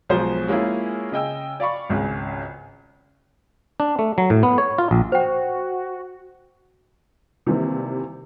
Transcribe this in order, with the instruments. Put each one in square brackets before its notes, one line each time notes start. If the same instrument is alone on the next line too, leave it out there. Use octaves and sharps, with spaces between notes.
[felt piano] B1 B2 F3 G#3 C5
G#3 A#3 C#4 E4 F4 G#4
C#3 D#5 G5 E6
D5 F5 B5 C#6
G#1 C#2 C#3
[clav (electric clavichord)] D4
A3
F#3
A2
B3
C#5
F4
A#1
[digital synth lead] F#4 [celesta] C5 G5
[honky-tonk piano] C3 D#3 E3 G3 A#3 C4